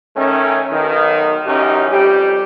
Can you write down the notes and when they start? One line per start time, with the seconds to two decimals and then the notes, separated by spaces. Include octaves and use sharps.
0.16 D#3 A3 C#4
0.72 B1 D#3
1.46 A1 F#2 C#4 D#4 G4
1.91 F2 G3 G4